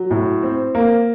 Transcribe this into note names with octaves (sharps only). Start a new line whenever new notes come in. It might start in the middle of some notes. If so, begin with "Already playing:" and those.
Already playing: F#3
A2
C4
A#3